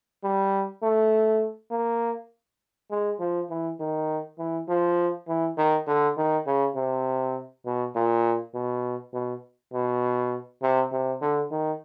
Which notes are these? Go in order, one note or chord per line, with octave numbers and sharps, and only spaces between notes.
G3
A3
A#3
G#3
F3
E3
D#3
E3
F3
E3
D#3
D3
D#3
C#3
C3
B2
A#2
B2
B2
B2
C3
C3
D3
D#3